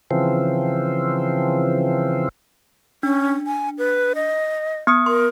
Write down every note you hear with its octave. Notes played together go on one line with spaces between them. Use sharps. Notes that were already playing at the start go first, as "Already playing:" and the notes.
C#3 E3 F3 C4
C#4 D4
G#5
B4
D#5
B3 D#6 C#7
A#4 C6